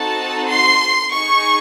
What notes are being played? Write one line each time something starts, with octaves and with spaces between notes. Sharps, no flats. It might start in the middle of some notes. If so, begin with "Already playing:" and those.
Already playing: C4 D#4 F#4 A4 A5
C6
D#4 G#4 C#6